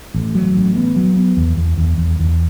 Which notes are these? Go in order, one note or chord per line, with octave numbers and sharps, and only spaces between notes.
A1
F#3
A1
B3
F#3
B3
E2
E2
E2
E2
E2